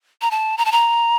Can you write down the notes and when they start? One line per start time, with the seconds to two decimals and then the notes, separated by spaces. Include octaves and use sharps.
0.22 A#5
0.31 A5
0.58 A#5
0.65 A5
0.72 A#5